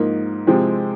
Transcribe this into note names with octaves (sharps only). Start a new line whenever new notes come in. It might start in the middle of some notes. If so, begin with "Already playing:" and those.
Already playing: G#2 F3 A#3 D#4 A#4
C3 F3 G#3 C4